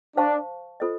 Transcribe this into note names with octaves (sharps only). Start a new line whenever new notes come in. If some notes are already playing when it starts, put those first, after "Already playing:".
D4 C5 F5 A5 C#6
F4 A4 C5 D#5